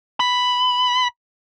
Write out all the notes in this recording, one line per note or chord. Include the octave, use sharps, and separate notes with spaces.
B5